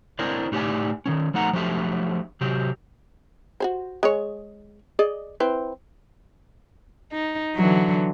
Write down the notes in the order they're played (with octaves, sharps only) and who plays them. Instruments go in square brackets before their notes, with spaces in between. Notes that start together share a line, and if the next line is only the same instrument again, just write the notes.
[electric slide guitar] C4 D4 E4 A#4 C5 D5
A2 D#4 G4 G#4 D5 G#5
D#3 F3 C#4
F3 A3 D#4 F#5 A#5
F3 F#3 A3 D4 G4 E5
C3 F#3 G4
[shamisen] F#4 G#4 C5
G#3 G#4 C#5
G#4 D5 D#5
C4 E4 B4
[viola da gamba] D#4
D3 E3 F#3